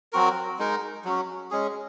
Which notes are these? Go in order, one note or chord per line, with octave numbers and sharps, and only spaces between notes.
F#3 C4 F#4 A#4
G#3 D#4 A#4
F#3 C#4 F#4
G#3 C#4 G#4